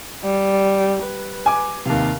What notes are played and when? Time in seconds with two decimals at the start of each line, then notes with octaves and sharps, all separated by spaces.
0.24 G3
1.02 B4
1.46 G#5 D6
1.85 D#2 C3 F5